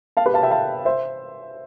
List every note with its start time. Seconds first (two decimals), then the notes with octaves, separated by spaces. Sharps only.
0.17 F5 A5
0.26 G4 B4
0.34 F5 A5
0.43 E5 G5
0.51 F5 A5
0.85 C5 E5